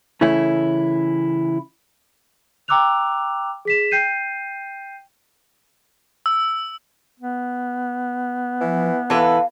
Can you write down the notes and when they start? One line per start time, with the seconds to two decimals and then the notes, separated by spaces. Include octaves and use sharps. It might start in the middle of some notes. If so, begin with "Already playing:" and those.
0.21 C#3 E3 A3 C#4 E4
2.68 G5 A#5 D6 E6 F#6 F7
3.65 G#4 B6 E7
3.91 G5 G6 C7 D#7
6.26 E6
7.20 B3
8.60 E3 F3
9.10 E3 A4 B4 F5